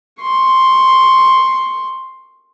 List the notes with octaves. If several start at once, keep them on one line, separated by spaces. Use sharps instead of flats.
C6 C#6